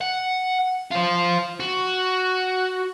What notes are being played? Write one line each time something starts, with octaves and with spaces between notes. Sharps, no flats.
F#5
F4 C5
F#4